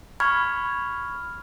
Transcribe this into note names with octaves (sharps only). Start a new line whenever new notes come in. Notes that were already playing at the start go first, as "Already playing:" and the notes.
B5 C#6 F6 G#6